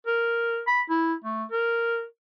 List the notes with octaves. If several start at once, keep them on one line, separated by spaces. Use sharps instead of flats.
A#4
B5
E4
A3
A#4